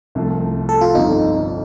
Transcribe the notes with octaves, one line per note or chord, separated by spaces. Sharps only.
C2 C3 F3 A3 C4
A4
F4
G1 F2 C3 G3 D#4